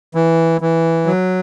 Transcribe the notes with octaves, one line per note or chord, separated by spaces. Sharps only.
E3
E3
F#3